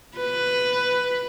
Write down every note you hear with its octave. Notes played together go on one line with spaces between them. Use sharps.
B4